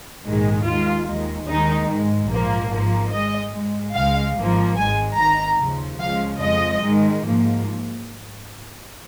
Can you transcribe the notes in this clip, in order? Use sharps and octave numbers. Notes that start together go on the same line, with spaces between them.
A#1 G#2 D#3 G#3
D#2 D#3 G#3 F4
D#2 D#3 G#3
D#2 D#3 G#3 D#4
G#2 G#3
A#1 G#2 F3 A#3
G#1 G#2 F3 A#3
G#2 G#3 D#5
G#2 G#3
C#2 C#3 G#3 F5
G#1 G#2 F3 A#3
G#1 G#2 G#3 G#5
G#1 G#2 D#3 A#5
D#2 C#3 F3
C#2 C#3 F3 G#3 F5
F2 F3 G#3 D#5
G#2 D#3 G#3
G#2 F3 A#3